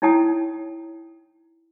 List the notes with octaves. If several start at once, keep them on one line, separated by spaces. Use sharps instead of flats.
D#4 E4 C#5 G5 A5 D#6